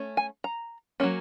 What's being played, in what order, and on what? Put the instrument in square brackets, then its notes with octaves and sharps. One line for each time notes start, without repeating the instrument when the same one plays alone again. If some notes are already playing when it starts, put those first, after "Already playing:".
Already playing: [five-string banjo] A3 C#4
G#5
A#5
F#3 A#3 C#4